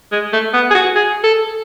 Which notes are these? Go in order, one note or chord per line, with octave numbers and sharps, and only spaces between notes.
G#3
A3
B3
G#4
F#4
G#4
A4